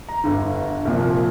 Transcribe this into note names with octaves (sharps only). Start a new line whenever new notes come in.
A#5
G1 G2 D3
C2 A#2 F3